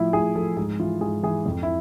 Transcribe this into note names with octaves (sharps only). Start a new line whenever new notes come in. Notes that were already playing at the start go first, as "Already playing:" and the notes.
Already playing: A2 F3 E4
A2 G#4
F3 A4
G#2 G#4
E3 F4
G#2 G#4
E3 G#4
F2
E4